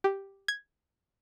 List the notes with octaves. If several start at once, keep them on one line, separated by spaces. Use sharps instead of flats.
G4
G#6